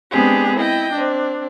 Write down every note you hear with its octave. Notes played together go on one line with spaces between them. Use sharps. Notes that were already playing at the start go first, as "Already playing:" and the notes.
G#3 B3 C4 D4 G4 G#4
E4 D#5 G5
C4 D4